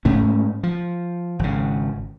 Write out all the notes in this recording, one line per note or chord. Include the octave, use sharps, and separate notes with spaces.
G#2 A3 C#4
F3
G#1 C#3